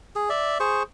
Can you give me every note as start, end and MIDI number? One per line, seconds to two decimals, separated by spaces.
0.16 0.29 68
0.30 0.58 74
0.30 0.58 76
0.60 0.83 68
0.60 0.83 72
0.60 0.83 85